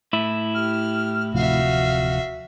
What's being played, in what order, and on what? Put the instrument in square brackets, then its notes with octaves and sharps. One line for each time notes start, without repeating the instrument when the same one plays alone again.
[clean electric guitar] A2 E4
[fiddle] G4 [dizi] F6
[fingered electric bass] D1 C3 F3 [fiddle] F#4 E5 [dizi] F5